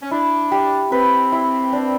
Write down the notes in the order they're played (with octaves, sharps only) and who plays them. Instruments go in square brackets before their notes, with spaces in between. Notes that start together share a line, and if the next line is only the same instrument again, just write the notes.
[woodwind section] C#4
[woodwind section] D4 [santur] E4
[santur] G4
[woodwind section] C4 [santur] B4
[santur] E4
D4